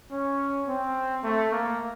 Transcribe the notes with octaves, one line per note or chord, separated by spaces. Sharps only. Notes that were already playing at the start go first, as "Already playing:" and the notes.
C#4
C4
A3
A#3